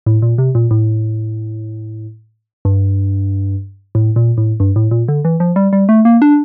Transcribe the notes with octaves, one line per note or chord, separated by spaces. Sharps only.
A2
A#2
C3
A#2
A2
G2
A2
A#2
A2
G2
A2
A#2
D3
E3
F3
G3
G3
A3
A#3
D4